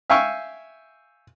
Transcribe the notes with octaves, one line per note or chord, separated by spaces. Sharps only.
E5 F5 G5 G#5 C#6 E6